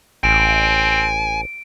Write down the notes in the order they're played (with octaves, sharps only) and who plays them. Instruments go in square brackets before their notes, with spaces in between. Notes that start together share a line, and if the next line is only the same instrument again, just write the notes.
[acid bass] A1 [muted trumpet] C4 [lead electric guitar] G#5 [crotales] D7